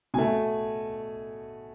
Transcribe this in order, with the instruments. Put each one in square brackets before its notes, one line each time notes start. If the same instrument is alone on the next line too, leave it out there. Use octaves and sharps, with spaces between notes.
[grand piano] B2 A3 G#5